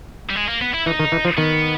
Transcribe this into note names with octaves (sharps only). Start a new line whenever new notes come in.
G3
G#3
A#3
B3
E4
E3 D#4
D#3
E3
F3
D#3 B3